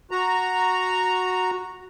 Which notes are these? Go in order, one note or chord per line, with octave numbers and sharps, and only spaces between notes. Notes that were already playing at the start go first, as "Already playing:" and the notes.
F#4 A#5